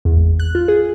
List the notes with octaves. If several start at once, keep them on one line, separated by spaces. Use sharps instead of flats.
E2
G#1
F#6
F4
G#4